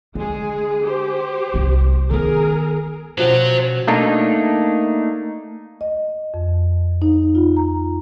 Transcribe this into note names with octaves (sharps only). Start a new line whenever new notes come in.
D3 G#3 G#4
G4 C5
C2 E4
D#3 B3 G#4 A#4
B2 F3 F#3 C#4 F#4 C5
A3 A#3 D4 D#4
D#5
F2
D#4
F4
A#5